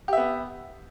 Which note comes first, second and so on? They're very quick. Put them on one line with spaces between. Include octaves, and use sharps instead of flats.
G4 E5 B3